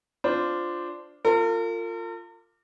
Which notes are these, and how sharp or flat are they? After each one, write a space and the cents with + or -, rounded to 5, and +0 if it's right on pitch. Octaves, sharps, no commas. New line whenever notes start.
D4 +0 F4 +0 C5 -10
F4 +0 A#4 -45